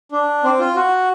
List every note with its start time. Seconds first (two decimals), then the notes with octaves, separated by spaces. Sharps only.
0.12 D4
0.44 C4
0.59 F4
0.76 F#4